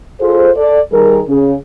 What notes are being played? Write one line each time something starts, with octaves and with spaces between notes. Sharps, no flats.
F4 G#4 A4 C5
A4 D5
D#3 G3 G#4 A#4
C#3